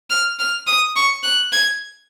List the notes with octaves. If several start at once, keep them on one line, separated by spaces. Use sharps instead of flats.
F6
F6
D#6
C#6
F#6
G#6